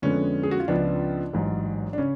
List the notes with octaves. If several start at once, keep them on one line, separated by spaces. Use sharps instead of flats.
F2 D3 G#3 B3 C#4
G#4
F#4
F4
C#2 C#3 F3 B3 D4
A1 G#2 F#3
D4
C#3 C#4